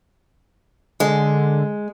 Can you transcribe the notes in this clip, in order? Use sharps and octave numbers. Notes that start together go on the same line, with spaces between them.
D3 G#3